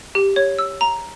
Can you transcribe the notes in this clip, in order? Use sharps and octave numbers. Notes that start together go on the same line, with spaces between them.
G4
C#5
E6
A#5